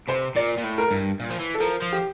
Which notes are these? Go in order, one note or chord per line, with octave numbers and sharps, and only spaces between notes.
C3 C5
A#2 D5
A#2
A2
A#4
G2
A#2
F3
E3
A4
F3 A#4
F3
G4